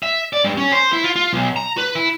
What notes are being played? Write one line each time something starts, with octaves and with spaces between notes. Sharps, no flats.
E5
D5
G2
C#4
C5
E4
F4
F4
B1
A#5
B4
E4